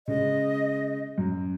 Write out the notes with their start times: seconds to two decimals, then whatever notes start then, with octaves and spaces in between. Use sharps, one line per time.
0.08 C#3 G#3 D#5
1.18 F#2